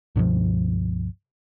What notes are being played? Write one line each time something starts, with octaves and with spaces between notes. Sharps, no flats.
C#2 G2 B2 F3